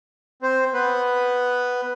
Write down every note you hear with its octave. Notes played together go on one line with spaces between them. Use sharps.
C4 C5
B3 B4